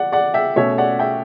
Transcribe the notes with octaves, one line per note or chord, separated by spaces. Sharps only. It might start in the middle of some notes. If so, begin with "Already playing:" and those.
Already playing: D5 F#5
D5 F#5
E5 G5
B2 A3 C#4 C#5 E5
D5 F#5
E5 G5